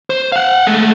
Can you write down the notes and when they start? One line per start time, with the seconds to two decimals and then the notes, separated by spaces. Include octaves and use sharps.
0.10 C5
0.32 F5 F#5
0.67 G#3 A3